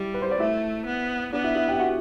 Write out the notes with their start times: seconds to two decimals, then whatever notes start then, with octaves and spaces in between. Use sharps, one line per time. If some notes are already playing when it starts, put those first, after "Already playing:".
Already playing: G3 E4
0.14 B4
0.22 C5
0.31 D5
0.40 A3 E4 E5
0.86 B3
1.33 B3 D4 D5
1.44 E4 E5
1.55 E4 E5
1.68 G4 G5
1.74 E5
1.80 F#4 F#5